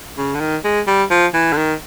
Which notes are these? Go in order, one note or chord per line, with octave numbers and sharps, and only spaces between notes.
C#3
D3
D#3
G#3
G3
F3
E3
D3
D#3